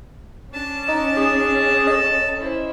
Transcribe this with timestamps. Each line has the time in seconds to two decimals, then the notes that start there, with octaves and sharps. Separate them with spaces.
0.52 C#4 D4 A5
0.88 D#4 D#5
1.17 G#4
1.87 A4 D#5 A5
2.40 E4 C5